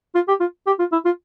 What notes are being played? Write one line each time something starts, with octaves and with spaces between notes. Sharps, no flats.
F4
G4
F4
G4
F4
E4
F4